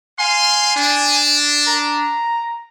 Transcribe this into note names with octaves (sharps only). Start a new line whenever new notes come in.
F5 G#5 C6
D4
A#5